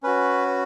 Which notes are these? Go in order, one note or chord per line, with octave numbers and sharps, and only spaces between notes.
C#4 F#4 B4